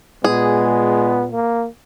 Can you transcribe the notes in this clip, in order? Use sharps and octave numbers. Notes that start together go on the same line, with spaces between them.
A#2 G#3 B3 G#4
A#3